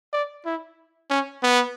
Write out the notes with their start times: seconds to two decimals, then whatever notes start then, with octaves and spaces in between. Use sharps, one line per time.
0.13 D5
0.46 E4
1.10 C#4
1.43 B3